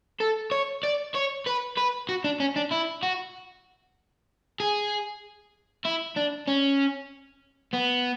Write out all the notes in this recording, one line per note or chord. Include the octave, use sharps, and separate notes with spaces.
A4
C#5
D5
C#5
B4
B4
F#4
D4
C#4
D4
E4
F#4
G#4
E4
D4
C#4
B3